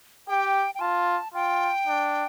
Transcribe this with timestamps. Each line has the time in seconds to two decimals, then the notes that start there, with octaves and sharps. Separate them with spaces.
0.28 G4 G5
0.75 G5
0.81 F4 A5
1.34 F4 G5
1.87 D4